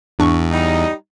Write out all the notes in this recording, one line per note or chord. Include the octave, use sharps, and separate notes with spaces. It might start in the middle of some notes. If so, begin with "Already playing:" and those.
E2 G#2 D4 C#6
G3 D#4